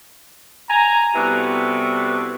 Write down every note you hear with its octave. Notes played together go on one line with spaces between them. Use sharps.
G#5 A#5
C3 G3 B3 E4 F#4 A4